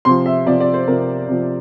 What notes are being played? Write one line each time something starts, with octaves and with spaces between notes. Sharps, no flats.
C3 F3 C6
E5
C3 F3 D5
D5
C5
C3 F3 A#4
C3 F3